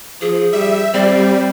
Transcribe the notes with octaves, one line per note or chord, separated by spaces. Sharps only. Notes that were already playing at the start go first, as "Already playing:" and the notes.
F3 G#4
G3 E5
G3 C4 D5